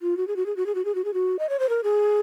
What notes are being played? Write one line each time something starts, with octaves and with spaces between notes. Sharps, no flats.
F4
F#4
G#4
F#4
G#4
F#4
G#4
F#4
G#4
F#4
G#4
F#4
D#5
C#5
C5
A#4
G#4